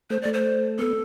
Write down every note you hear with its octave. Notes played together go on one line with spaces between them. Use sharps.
A3 C5
D5
A3
C5
B3 A4